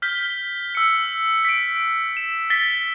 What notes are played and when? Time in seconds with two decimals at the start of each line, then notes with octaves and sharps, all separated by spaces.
0.02 F6 G6 B6 G7
0.75 E6 C#7
1.45 B6 D7
2.17 E7
2.50 A6 B6 G7